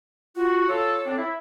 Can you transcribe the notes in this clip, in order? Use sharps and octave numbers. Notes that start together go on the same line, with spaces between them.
F4 F#4
F4 A4 C#5
D3 C4 D4
E4